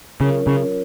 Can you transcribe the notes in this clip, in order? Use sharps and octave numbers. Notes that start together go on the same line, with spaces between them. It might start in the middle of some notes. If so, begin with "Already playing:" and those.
C#3 F#3 C#4 F4 A#4 C#5
C#3